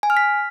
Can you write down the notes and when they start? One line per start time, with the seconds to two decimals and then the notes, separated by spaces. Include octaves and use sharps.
0.03 G#5
0.10 F6
0.17 B6